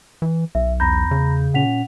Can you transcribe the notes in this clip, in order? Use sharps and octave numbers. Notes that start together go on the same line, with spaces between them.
E3
B1 E5
E2 A#5 B5 G6 A#6
C#3
A#2 C#4 F#5 B6 F7